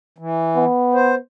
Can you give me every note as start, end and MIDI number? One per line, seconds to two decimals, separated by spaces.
0.18 0.65 52
0.56 1.18 59
0.94 1.15 72